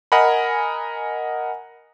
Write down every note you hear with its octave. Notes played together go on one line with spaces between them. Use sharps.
A#4 D#5 F#5 G#5 B5